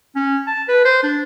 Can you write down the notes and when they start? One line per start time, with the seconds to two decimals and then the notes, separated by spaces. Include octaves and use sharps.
0.15 C#4
0.47 A5
0.68 B4
0.85 C5
1.03 D4